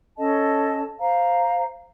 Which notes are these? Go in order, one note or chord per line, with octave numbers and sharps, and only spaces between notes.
C#4 A4 D#5 A5
C5 F5 A#5